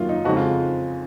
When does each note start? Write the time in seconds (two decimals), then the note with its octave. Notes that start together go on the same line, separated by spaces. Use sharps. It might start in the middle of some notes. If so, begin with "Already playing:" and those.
Already playing: F#2 D#3 F#3 A#3 F4
0.09 D#4
0.25 F2 C#3 G#3 C4 D#4 F#4
0.37 F4